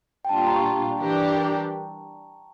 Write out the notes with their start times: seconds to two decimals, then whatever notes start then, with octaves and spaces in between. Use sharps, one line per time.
0.25 G5
0.29 A#2 G3 D4 F4 A5
0.38 G5
0.47 A#5
0.56 C#6
0.99 E3 G3 D4 G4 A#4